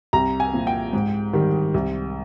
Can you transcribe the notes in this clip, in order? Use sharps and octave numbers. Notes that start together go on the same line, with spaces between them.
C2 A#5
G#5
A#2 F3
G5
G#2
D#3 G3
C2